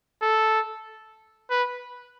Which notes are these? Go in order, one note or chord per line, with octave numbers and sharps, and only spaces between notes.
A4
B4